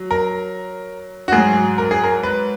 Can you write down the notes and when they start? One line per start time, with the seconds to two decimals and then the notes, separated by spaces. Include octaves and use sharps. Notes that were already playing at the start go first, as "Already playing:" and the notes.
Already playing: F#3
0.11 A#4
1.28 F#4
1.32 G#2 F#3 G#4
1.78 A#4
1.91 G#4
2.04 A#4
2.23 B4